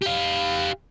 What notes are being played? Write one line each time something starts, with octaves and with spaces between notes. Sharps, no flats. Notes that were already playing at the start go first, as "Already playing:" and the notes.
G4 F5